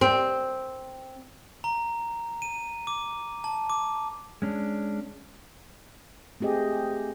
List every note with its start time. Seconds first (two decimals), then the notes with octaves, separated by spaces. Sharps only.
0.01 C4
1.64 A#5
2.42 D#7
2.87 D6
3.44 A5
3.70 D6
4.42 G#3 C#4 D4
6.40 A3 C4 G4 G#4 D#5